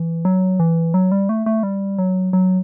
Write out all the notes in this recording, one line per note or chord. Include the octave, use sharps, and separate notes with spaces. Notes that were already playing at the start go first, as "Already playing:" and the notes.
Already playing: E3
F#3
E3
F#3
G3
A3
A3
G3
F#3
F#3